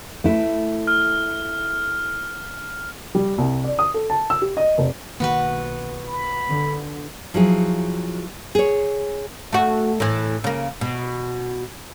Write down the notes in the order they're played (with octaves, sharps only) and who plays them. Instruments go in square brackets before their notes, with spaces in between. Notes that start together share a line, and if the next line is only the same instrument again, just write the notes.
[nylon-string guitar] A3 E4
[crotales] F6
[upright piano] G3
C2
D5
D#6
A4
A5
E6
G4
D#5
F1
[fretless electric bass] B1 D#3 A#3 [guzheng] B3 F#4 B4
[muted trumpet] B5
[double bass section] D3
[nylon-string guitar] F3 F#3 E4 G#4
G#4 C#5
[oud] A3 F#4
A2 E3
C#3 A#3
B2